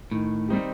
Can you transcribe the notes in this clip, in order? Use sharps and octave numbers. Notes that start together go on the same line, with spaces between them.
A2 D#3
G3 C4 D#4 G4